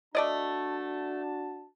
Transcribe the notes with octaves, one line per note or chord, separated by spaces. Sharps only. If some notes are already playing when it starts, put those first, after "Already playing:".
A3 D4 F#4 D5 D#5 A5